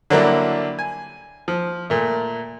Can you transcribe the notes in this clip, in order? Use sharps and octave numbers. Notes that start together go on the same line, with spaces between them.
D3 F#3 G3 A#3 D4 E4
G#5
F3
A#2 A3